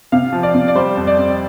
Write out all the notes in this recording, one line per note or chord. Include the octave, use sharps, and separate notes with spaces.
C3 F5
F3
D5
C3
D5
G3 C5
F2
D5
F2